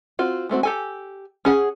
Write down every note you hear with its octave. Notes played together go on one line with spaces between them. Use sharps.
C4 F4 F#4
G#3 A3 C4 F#4
G4 A4 G#5
C#4 G#4 F#5